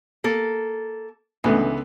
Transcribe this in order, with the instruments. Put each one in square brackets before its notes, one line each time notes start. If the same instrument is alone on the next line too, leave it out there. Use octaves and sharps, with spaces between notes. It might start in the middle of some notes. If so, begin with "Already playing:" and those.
[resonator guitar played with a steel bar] A#3 A4
[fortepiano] C#2 D3 B3 [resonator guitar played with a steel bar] E3